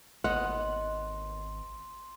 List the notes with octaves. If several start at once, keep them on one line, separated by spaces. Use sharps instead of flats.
G#1 D#2 B3 D#5 F#5 C6